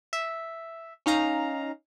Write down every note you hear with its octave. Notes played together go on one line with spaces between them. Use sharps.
E5
C#4 D#4 F5 A#5